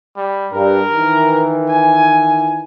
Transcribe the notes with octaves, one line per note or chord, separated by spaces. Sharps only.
G3
G2 A#4
D#3 E3
G#5